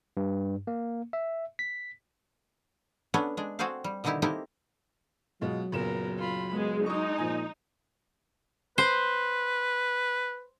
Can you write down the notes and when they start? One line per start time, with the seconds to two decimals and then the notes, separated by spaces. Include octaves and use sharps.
0.17 G2
0.67 A#3
1.13 E5
1.59 B6
3.14 B3 C#4 D4 A4 B4 C#5
3.37 G#3 D4
3.59 C4 F#4 G#4 A4 C5 F5
3.84 G3
4.04 B2 D3 D#3 D#4 E4 G4
4.22 A#3 C4 D#4 E4 G4 A4
5.41 B2 F#3 G#3 F4
5.72 F#1 A#2 B3 A#4 E7
6.18 F4 B5
6.54 G#3 B3
6.86 G#3 D#4 C#6 D#6
7.18 A#2 F3 G#5
8.78 B4 C5